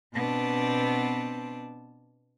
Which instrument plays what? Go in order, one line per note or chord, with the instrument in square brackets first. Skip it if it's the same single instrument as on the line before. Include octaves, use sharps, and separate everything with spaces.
[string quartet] B2 B3 C4 D4 A5